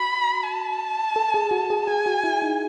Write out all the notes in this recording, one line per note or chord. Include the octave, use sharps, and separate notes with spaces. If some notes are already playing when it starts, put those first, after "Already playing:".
Already playing: F#4 B5
A5
A4
G#4
F#4
G#4
G#4 G#5
F#4
E4
D#4